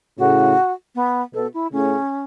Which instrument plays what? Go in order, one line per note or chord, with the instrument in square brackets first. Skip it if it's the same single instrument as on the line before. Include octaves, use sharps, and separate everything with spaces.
[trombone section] A2 C#3 [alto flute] F#4
[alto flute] B3
[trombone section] B2 [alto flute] A4
[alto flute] E4
[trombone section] A2 C#3 [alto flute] C#4